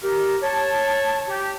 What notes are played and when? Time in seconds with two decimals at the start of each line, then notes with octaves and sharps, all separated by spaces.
0.02 G4 A#4
0.43 C#5 A5
1.29 G4